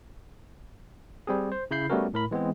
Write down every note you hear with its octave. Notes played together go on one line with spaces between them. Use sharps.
G3 C4 G#4
C5
C#3 E4 B5 G6 C7
G3 A3 B3 C#4 F#4 A#4
A2 A#4 B5
E3 G#3 B3 C4 G#4